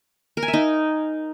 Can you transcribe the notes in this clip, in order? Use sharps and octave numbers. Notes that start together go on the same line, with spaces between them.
A#4
G#5
E5
D#4